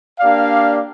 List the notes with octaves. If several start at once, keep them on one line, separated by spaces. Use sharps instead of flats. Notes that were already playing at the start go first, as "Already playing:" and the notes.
A#3 D4 G4 D5 F5